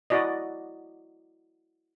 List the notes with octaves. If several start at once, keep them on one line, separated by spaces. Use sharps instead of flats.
E4 F#4 D5 D#5